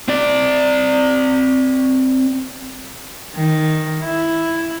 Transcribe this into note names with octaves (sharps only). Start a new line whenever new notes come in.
C4 D5
D#3
E4